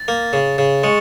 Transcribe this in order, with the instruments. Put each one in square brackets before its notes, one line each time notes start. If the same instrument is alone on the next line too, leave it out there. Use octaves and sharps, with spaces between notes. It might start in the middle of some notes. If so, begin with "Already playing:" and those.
Already playing: [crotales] A6
[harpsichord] A#3
C#3
C#3
[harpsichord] G#3 [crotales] C#6 C#7